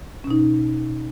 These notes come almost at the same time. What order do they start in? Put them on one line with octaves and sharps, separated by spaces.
C#4 B2 D#4